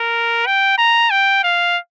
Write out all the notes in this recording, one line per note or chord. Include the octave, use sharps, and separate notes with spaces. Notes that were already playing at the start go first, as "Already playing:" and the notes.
Already playing: A#4
G5
A#5
G5
F5